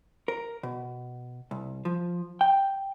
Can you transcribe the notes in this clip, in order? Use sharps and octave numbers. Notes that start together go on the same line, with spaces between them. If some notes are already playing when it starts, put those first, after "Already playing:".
A#4
B2
C2
F3
G5